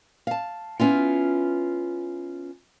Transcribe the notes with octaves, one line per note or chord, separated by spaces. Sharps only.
F5 A5
B3 C#4 E4 F4